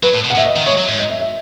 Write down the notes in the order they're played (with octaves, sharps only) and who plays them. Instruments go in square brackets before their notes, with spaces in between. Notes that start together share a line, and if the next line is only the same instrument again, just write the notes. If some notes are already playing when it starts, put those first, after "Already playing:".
[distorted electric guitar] F#3 [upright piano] B4
[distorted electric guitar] A2
B2
[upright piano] F#5
[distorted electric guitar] A2 [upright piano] E5
[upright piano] D#5
[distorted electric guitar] D#3
[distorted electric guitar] G#3 [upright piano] C#5
[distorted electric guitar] F#3
G#2
[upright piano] D#5
E5
E5